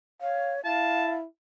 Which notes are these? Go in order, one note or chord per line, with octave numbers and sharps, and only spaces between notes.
C#5 F5
E4 F5 A5